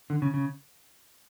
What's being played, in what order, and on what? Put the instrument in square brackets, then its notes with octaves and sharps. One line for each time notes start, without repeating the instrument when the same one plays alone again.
[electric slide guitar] D3
C#3
C#3